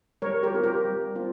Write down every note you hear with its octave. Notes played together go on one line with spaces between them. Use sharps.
G3 A#4 C#5
G4 A#4
C4 F4
G4 A#4
G3
C4 F4